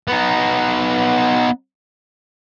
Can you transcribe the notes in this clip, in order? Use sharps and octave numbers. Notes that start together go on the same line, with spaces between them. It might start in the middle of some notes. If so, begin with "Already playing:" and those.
B3 D#4